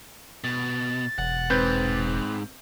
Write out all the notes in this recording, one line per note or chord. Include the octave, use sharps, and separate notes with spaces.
B2 A6
E1 F#5
G#2 C4 B4 G6